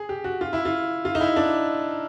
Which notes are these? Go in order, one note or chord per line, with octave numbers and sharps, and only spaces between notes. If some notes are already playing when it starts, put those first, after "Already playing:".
Already playing: G#4
G4
F#4
F4
E4
F4
F4
D#4
E4
D4